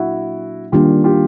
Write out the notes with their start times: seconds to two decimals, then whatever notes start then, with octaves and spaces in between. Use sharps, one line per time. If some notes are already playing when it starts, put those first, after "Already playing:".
Already playing: A#2 F#3 A#3 D4 E4 F#4
0.72 D#3 G3 A#3 D4 F4 G4
1.04 F4 G4